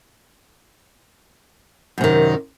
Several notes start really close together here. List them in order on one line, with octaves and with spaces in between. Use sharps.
F#2 C3 D#3